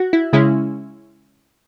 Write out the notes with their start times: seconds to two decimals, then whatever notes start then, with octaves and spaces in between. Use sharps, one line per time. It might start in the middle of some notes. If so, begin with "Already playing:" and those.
Already playing: F#4
0.13 E4
0.33 C#3 G#3 C#4 E4